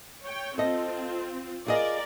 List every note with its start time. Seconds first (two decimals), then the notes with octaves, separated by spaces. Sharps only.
0.24 C#5 G5
0.58 C4 F4 A4 D#5
1.67 F4 G#4 A#4 D5 D#5